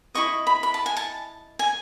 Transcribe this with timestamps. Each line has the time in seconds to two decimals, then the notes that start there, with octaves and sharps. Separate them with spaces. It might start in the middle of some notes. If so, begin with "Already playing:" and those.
0.15 E4 A4 D#5 C#6
0.47 B5
0.63 B5
0.74 A5
0.86 G#5
0.97 A5
1.59 G#5